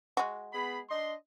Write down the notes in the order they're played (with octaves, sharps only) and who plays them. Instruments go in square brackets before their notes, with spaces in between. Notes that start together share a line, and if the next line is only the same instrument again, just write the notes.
[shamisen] G#3 F#4
[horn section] B3 G#4 B5
D4 D#5 C6